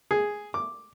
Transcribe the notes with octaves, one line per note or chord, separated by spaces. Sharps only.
G#4
D6